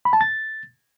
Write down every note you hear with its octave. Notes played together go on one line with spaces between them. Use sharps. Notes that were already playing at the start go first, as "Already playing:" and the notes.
B5
A5
A6